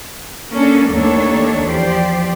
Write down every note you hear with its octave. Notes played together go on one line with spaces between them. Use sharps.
A#3 C#4 D4 A4
D#2 A3 A#3 D4 A4 C#5
E2 F3 G4 C5 D5